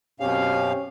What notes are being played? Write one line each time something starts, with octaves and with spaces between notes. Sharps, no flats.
F#2 B2 C4 C#4 G4 F5